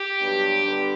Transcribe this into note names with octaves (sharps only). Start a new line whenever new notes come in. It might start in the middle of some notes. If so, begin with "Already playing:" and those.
Already playing: G4
G2 F#3 B3 D4
D3 G3 B3 D4